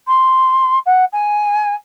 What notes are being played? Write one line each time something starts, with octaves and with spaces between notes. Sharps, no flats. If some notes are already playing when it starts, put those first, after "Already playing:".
C6
F#5
G#5